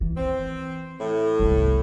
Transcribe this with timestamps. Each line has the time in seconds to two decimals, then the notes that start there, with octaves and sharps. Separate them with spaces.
0.01 E3
0.17 C4
0.99 A2
1.39 G1 C2